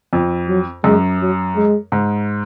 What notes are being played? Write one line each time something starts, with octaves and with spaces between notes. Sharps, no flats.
F2
F#3
F#2 G#3
F#3
G#3
G#2